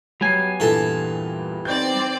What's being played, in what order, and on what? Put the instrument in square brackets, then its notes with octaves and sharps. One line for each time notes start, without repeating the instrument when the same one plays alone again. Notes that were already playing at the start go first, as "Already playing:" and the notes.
[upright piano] F#3 C7 [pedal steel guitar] G3 B3 G#5
[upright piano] E2 G2 A#2 [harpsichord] E3 A4
[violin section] C4 D5 [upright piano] D#4 G6